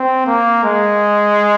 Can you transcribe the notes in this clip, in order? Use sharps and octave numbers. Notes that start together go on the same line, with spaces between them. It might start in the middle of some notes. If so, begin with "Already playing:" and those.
Already playing: C4
A#3
G#3